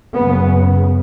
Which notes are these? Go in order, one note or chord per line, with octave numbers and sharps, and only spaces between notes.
F#2 C#3 B3